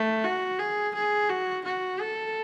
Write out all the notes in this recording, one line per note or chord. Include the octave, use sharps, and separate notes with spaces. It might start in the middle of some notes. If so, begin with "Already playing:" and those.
Already playing: A3
F#4
G#4
G#4
F#4
F#4
A4